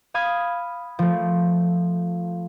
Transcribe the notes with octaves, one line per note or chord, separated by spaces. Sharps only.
F5 B5 D#6 G#6 C7
F3 A3